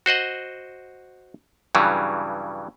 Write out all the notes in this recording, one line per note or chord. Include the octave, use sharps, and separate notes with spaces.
F#4 C5 D#5 F#5
G2 C#3 E3 F#3 G3